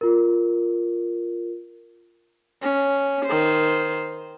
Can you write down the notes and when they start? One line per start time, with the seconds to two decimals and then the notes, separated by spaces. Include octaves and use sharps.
0.01 F4 A#4
2.62 C#4
3.25 D#3 C5